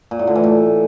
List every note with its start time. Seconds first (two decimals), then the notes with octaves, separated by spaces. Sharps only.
0.11 A#2
0.19 A2
0.27 D3
0.35 E3
0.44 A2